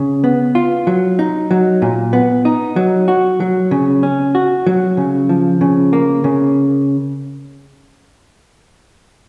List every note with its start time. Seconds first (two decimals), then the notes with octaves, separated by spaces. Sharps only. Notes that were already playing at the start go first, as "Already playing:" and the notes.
Already playing: C#3
0.24 B3
0.55 F4
0.87 F#3
1.19 D#4
1.51 F#3
1.82 A#2
2.13 B3
2.45 D#4
2.76 F#3
3.08 F#4
3.40 F#3
3.71 C#3
4.03 C#4
4.35 F#4
4.67 F#3
4.97 C#3
5.29 F3
5.61 C#3
5.93 A#3
6.24 C#3